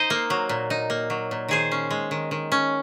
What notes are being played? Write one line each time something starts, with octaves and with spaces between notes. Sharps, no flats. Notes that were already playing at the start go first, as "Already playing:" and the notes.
Already playing: D#4 C5 D#5
A#3
F#3
A#2
D#4
A#3
F#3
A#2
D#3 G#4 C5
C#4
G#3
D#3
D#3
C#4